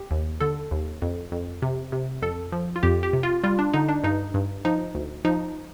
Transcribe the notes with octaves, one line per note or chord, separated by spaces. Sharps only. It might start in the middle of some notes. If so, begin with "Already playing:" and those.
Already playing: G4
D#2
D3 A4
D#2
F2
F2
C3
C3
F2 A4
F3
F4
F2 G4
G4
C3
F4
G3 F4
D4
D3 D#4
D4
G2 D#4
G2
F3 D#4
D2
F3 D#4